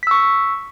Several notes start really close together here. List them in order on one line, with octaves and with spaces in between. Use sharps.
B6 E6 C#6